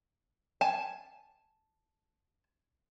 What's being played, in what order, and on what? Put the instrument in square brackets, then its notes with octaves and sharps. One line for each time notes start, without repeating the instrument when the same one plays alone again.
[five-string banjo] G#5 A5